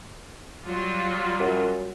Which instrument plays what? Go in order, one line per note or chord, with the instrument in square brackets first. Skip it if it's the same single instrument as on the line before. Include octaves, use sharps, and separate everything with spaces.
[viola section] F#3 G3 F4
[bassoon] F#2